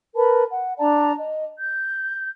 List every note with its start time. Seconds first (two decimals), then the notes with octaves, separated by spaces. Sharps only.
0.16 A#4 B4 A5 B5
0.50 F#5
0.79 D4 D5 A5 A#5
1.18 D#5
1.57 G6